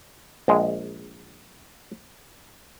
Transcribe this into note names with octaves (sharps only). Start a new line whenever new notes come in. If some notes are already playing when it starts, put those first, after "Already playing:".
A#1 G#3